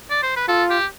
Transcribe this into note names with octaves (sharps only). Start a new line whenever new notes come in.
D5
C5
B4
F4 A4
G4